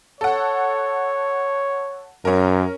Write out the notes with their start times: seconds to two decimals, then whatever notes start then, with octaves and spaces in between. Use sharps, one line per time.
0.21 A4 C#5 F#5
2.25 F#2 C#4 A#4